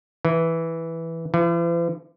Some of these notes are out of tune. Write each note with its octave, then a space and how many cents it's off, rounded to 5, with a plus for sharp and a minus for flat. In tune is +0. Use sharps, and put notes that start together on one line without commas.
E3 -5
E3 +45